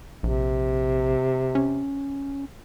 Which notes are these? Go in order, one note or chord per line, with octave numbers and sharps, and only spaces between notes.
A#1 C3
C#4